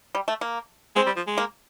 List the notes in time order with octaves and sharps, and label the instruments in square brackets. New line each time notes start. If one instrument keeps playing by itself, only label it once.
[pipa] G3
A3
A#3
[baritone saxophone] G#3 [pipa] C4
[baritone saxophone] G3
F3
G#3
[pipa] A#3